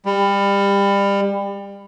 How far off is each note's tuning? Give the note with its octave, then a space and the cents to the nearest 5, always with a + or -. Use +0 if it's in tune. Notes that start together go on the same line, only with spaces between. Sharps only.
G3 +25